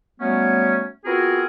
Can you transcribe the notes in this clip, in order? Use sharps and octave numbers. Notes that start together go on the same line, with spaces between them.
F#3 G3 A3 B3 C#4
B3 C4 F4 F#4 G#4 A#4